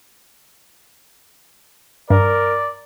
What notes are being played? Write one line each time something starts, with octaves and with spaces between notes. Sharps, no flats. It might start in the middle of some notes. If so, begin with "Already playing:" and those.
G2 A#4 D5